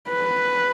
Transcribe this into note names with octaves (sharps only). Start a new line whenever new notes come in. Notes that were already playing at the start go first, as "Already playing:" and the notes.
B4